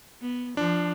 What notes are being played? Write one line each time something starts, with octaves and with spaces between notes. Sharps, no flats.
B3
F3 D4